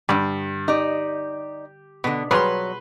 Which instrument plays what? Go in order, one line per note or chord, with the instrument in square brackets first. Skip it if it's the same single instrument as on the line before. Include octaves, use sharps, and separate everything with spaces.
[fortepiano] G2 [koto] D3 G3
[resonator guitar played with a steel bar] D#4 D5 [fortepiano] G4
[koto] B2 [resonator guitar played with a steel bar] D3 B3
[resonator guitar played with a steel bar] F#3 C#5 [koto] G3 F4 G#4 [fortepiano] B4 C6